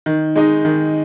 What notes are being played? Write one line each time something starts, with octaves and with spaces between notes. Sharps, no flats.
D#3
G#3 D#4
D#3